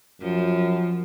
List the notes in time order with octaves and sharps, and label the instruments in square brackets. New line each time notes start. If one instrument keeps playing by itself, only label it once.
[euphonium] F#2 [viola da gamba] F3